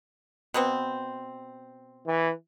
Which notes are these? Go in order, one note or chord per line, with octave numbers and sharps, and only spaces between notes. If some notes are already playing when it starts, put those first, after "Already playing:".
B2 B3 C4
E3